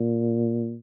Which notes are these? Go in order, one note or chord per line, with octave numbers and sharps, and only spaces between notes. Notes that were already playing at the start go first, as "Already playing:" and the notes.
Already playing: A#2